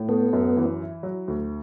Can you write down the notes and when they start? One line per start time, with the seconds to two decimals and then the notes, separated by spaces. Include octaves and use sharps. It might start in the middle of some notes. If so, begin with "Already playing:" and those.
Already playing: A2
0.09 A3 B3
0.33 F#2
0.57 E3
0.80 E4
1.03 F#3
1.28 D2